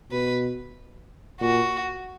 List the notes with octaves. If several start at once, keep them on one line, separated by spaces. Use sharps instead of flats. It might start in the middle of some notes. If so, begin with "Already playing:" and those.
B2 B4
A#2 F#4